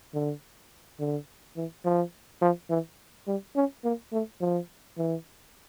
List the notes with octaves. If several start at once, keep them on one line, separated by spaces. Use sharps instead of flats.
D3
D3
E3
F3
F3
E3
G3
C#4
A#3
A3
F3
E3